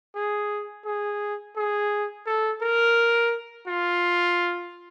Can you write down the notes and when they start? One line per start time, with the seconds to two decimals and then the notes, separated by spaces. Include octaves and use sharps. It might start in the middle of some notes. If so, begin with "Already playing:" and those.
0.15 G#4
0.85 G#4
1.56 G#4
2.26 A4
2.61 A#4
3.67 F4